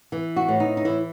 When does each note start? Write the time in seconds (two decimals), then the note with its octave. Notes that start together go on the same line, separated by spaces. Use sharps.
0.12 E3
0.36 F#4
0.48 A2
0.60 D#4
0.77 D#4
0.85 E3 E4